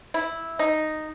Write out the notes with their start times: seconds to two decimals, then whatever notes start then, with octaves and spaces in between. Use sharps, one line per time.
0.14 E4
0.59 D#4